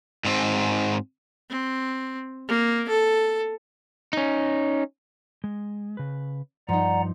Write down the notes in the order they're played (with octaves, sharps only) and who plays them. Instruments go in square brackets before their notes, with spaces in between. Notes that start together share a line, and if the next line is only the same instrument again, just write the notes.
[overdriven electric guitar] G#2 C4
[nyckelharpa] C4
A#3
A4
[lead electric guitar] C#4 D#4
[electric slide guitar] G#3
C#3 B4
[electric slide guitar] G2 [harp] F3 D#4 [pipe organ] D5 F#5 A#5